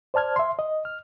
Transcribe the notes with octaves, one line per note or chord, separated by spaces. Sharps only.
C5 D5 A5 F6 G#6
E5 C6
D#5
F6